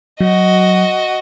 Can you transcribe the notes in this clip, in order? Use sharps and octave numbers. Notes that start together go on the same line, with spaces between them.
F#3 F#4 D#5